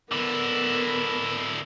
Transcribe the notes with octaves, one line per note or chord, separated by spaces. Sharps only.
D3 B3 E4 A#4